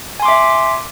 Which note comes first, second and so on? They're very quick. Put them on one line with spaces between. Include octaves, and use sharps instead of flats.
G#5 C6 D6 E5